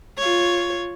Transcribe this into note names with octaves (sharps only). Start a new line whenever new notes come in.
F4 C#5